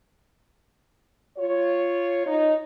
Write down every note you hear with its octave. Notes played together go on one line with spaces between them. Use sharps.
F4 C#5
D#4